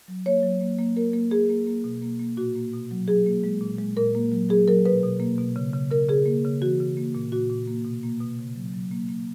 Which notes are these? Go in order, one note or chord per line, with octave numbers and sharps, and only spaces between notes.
F#3
A#3 C#5
F#3
A#3
A#3
A#3 A#4
A#3
A#3 G#4
A#3
A#3
B2
A#3
A#3
A#2 F#4
A#3
B2
F#3
F#3 G#4
A#3
G#3
A#2
G#3
A#2 A#4
A#3
F#3
F#3 G#4
F#3 A#4
B2 B4
B2
A#3
B2
C#3
C#3
C#3 A#4
C#3 G#4
A#3
C#3
E3 F#4
C#3
A#3
A#2
A#2 F#4
A#2
A#3
B2
A#3
B2
C#3
F#3
F#3
A#3
A#3